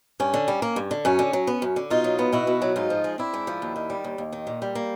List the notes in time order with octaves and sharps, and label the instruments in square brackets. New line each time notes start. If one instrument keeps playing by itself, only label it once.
[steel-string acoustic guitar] G2 C#4
D3
G3
A#3
G2
D3
F#2 C#4
D3
F#3
B3
F#2
D3
B2 D#4 F4
F#3
B3
B2 E4 F#4
B2
F#3
G#2 D#4 F4
F3
G#3
C4 D4 E4
G#2
F3
D#2
D#3
G3
D#2
D#2
D#3
A#2
G3
A#3